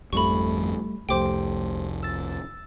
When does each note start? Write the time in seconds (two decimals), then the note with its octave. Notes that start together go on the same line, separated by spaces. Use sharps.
0.13 G#1 F2 F3 G3 A3 B5 C#6
1.09 C2 F2 A3 G4 C5 G5 D6
2.03 E6 A6